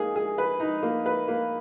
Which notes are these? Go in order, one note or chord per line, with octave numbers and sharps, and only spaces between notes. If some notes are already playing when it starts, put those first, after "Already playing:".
Already playing: A#3 D#4 G#4
G#4
B4
D#4
A#3
B4
A#3